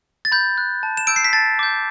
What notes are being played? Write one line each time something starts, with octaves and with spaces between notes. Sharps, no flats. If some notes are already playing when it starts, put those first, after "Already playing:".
A6
B5 G6
F#6
A5
E7
E6 G6 D7
C7
B6
A5 A6
D6 G6